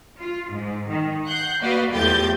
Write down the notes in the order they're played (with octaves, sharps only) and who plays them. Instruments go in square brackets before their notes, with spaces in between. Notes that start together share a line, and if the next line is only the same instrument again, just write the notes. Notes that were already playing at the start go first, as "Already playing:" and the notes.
[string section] F4
G#2
D#3
F#5 F#6 G6 C7
A#3 F#4 B4 D5 D#5 F5
E2 A2 F3 G4 G6 A6